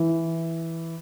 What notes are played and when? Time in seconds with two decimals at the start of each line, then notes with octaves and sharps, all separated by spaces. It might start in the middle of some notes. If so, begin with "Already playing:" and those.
Already playing: E3